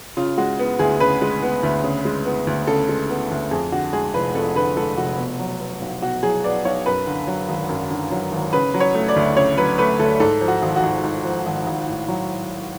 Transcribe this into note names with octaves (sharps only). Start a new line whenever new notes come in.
C#3 F4
G#3 F#4
B3
D2 G#4
C#3 B4
G#3
B3
D2
C#3
G#3
B3
D2
C#3 A4
G#3
B3
D2
F2 G#4
D3 F#4
G#3 G#4
F1 B4
F2 A4
D3 B4
G#3 A4
F1 F#4
B2
F#3
B3
B1
B2 F#4
F#3 G#4
B3 D5
B1 C#5
F#2 B4
D3
F#3
G#1
F#2
D3
F#3
G#1
C#3 B4
F#3
C#5
A3
D5
D2
C#3 C#5
F#3 B4
A3 B4
D2 A4
G#2 A4
F3
F#4
G#1
F#4
G#1
G#2
F3
G#1
G#1
A2
F#3